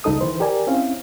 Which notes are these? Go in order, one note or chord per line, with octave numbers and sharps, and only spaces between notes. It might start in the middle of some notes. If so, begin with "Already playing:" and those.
C#2 G3 D#4 A4 D#6
D#3 E3 B4 C5
G4 A#4 D5 G#5
C4 C#4 E4 F5